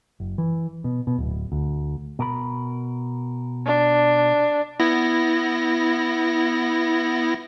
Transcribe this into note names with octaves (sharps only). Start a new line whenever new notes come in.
F#1
E3
B2
B2
D1
D2
B2 A#4 B5
D4
B3 E4 A#6